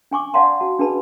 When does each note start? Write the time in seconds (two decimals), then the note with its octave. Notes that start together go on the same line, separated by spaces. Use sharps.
0.11 D4 G#5 C#6 D6
0.34 D5 F5 F#5 A5 C6
0.60 F#4 A5
0.79 D4 G#4 B4 A5 B5